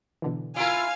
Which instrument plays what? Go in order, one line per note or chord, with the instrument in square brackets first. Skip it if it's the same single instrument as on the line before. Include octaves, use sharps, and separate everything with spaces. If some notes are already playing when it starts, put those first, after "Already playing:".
[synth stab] B2 D3 E3
[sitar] E4 F4 A#4 [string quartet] F5 G#5 F6